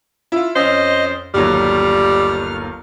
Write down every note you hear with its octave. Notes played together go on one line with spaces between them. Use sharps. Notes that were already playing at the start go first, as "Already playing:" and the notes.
E4 F4
F2 C#4 C5 D#5
G1 D#2 F#3 G3 F6